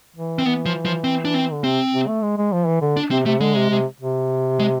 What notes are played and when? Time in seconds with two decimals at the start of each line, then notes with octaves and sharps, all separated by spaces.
0.16 E3
0.39 C4
0.46 E3 B3
0.66 F3
0.85 F3
1.04 C4
1.25 D4
1.34 C4
1.52 D3
1.64 C3 C4
1.93 C3
2.07 A3
2.23 G#3
2.37 G#3
2.52 F3
2.67 E3
2.81 D3
2.97 D4
3.11 C3 C4
3.26 C3 A3
3.41 D3 G#3
3.56 C3
3.70 C3
4.00 C3
4.59 G#3